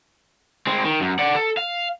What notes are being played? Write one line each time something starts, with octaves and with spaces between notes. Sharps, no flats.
G#3 C4
D#3
F#2
D5 F#5
A4
F5